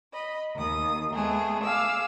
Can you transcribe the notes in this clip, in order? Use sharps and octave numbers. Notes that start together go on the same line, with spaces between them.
D#5 B5
D#2 D#6
G#3 A3 B3 G#4
F5 G#5 D6 E6